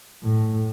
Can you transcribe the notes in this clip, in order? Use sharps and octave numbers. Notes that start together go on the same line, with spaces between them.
A2